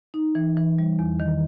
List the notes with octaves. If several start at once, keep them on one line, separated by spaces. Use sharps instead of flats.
D#4
E3
E3
G3
E2
D#3